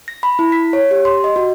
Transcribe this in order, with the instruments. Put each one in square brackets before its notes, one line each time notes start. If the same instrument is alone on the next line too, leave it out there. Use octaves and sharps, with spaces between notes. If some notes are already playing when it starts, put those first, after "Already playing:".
[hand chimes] A#6
B5
E4
B6
C#5
G4
C6
D#5
F#4